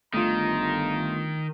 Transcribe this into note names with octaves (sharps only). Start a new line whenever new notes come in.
G1 D#3 A3 F4 A#5